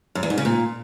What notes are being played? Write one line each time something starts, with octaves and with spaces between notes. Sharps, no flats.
F#2
E2
G#2
C#3
A#2